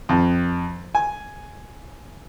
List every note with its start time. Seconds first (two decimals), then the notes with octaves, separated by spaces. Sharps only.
0.09 F2
0.95 G#5